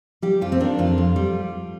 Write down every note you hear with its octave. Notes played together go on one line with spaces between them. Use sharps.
G3 G4
F2 F4
C4
D#3 D4
F2 F4
F2
G3